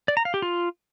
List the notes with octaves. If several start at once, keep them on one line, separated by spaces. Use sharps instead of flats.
D5
A#5
F5
G4
F4